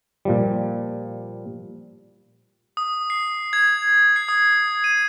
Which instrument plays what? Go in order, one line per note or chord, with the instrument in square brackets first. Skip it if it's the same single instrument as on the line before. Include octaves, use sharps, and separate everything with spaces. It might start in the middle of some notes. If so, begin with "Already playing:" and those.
[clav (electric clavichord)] A#2 F3 G3
[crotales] D#6
C7
G#6
C7
D#6
D#7